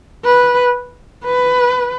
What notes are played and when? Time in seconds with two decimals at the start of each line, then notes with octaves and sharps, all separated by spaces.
0.25 B4
1.25 B4